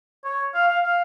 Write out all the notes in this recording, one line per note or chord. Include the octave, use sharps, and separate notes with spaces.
C#5
F5
F5
F5